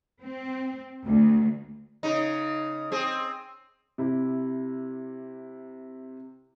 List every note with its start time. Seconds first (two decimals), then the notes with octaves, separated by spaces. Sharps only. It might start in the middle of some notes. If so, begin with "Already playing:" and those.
0.23 C4
1.06 D2
2.03 C#3 D#4
2.92 C4 G#4
3.98 C3 E4